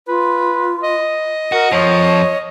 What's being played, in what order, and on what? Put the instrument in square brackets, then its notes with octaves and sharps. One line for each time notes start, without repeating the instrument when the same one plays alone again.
[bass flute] F4 [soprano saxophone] B4
[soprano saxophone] D#5
[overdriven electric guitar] F#4 [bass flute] A#4
[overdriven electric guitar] F2 F3 [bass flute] C#5